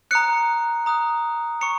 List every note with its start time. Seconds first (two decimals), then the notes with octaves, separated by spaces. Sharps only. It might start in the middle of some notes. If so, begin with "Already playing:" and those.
0.11 A#5 D#6 F#6 C#7
0.86 A#5 D#6 F#6
1.61 A#5 C#6 C#7